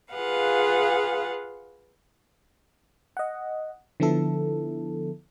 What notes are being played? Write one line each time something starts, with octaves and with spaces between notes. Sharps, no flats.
F4 G#4 B4 F5 F#5
D#5 F#5
D3 F3 B3 E4 A4